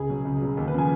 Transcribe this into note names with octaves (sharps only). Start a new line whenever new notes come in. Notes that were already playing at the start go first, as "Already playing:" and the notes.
Already playing: C#2 G#4
B2 F#3
C#2
B2 F#3
D#2
B4
C#3 F3 G#5